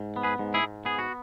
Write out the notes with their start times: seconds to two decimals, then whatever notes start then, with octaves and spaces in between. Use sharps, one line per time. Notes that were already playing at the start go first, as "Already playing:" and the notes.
Already playing: G#2
0.16 B3
0.23 G#4 B4
0.39 G#2
0.54 E4 G#4
0.63 G#2
0.85 B3 G#4
0.99 F#4